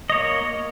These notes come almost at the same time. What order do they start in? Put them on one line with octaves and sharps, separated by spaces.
D#5 C#5 A#3